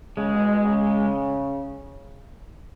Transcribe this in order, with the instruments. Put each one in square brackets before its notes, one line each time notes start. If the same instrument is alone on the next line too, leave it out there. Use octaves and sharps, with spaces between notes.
[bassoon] C#3 [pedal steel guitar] G#3
[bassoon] B2
B2
C#3